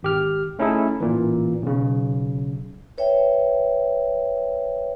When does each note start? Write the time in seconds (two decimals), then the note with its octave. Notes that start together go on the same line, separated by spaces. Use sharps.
0.03 G#1 G4 F6
0.59 A3 C#4 D#4 E4 G#4 A4
1.00 A1 A#2 E3
1.62 B1 C#3
2.98 B4 C#5 E5 G5